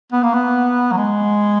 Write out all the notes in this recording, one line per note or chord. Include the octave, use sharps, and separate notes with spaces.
B3
A#3
B3
F#3
G#3